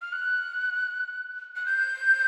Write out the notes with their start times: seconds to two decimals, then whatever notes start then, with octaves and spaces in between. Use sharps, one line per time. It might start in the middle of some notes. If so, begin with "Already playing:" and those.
0.02 F6
0.13 F#6
1.56 F#6
1.66 G6